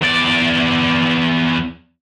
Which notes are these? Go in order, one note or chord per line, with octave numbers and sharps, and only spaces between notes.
E2 D5